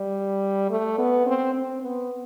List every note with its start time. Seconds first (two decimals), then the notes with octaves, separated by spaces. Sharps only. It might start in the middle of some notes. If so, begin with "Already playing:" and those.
Already playing: G3
0.70 A3
0.98 B3
1.26 C4
1.54 C4
1.83 B3